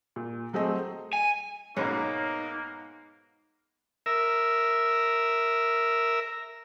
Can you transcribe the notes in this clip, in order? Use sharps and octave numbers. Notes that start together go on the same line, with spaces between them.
A#2
F#3 A3 C4 G#4 D#5
G#5
G#2 B2 A#3 D#4 C#5
A#4 E5